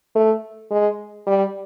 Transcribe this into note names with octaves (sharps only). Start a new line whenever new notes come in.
A3
G#3
G3